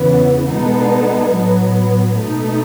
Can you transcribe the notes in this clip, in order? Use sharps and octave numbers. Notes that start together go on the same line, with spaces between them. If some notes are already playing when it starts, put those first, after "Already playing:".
Already playing: E2 C#3 E3 B3
B2 G#3 B3 D#4 A4
A2 F#3 B3
B2 A3 D#4 A4